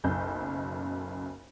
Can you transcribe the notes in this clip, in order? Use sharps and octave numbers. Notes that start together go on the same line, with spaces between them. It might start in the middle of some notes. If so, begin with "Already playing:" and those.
F#1 B1 F#2 G6